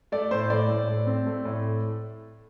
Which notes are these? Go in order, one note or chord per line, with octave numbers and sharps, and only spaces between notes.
A3 D5
A2 C5
A2 D5
A2
A3
C4
A3
A2